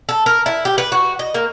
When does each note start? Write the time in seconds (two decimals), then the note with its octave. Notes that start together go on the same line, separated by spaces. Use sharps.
0.09 A4
0.26 A#4
0.46 E4
0.65 G4
0.78 B4
0.92 F#4
1.19 D#5
1.34 A#3